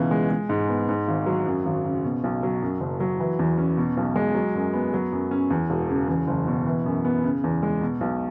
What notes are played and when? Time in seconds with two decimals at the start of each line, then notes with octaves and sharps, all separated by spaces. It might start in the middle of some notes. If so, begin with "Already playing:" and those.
Already playing: C#2 B2 E3
0.11 G#3
0.30 G#3
0.49 G#2
0.69 B3
0.89 G#2
1.08 G#1
1.26 F#3
1.46 F#2
1.66 G#1
1.85 C#3
2.04 B2
2.24 B1
2.43 F#3
2.62 F#2
2.80 F#1
3.00 F#3
3.20 E3
3.39 E2
3.58 C#4
3.77 B2
3.97 B1
4.16 G#3
4.35 F#3
4.55 F#2
4.73 B3
4.94 F#3
5.12 F#2
5.31 C#4
5.50 E2
5.70 E1
5.90 C#3
6.08 E2
6.27 F#1
6.47 B2
6.67 E3
6.86 F#2
7.05 B3
7.24 C#3
7.44 E2
7.63 G#3
7.81 B2
8.01 B1